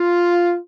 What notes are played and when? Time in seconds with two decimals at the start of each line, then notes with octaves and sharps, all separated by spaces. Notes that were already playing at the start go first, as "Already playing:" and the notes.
Already playing: F4